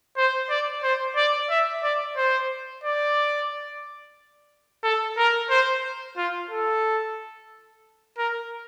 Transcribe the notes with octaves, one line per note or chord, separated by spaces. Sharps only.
C5
D5
C5
D5
E5
D5
C5
D5
A4
A#4
C5
F4
A4
A#4